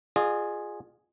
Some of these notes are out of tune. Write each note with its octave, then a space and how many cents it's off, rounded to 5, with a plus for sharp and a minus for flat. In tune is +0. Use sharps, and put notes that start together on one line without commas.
F4 +15 G#4 +0 D#5 -45